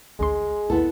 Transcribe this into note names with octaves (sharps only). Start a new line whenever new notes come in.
A1 D2 G#3 C6
B1 E2 B3 E4 A4